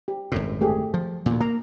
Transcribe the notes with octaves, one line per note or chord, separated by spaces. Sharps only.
G4
G#1 F#2 A2
A3 G4 G#4
F3
D2 A#2
A#3 A#5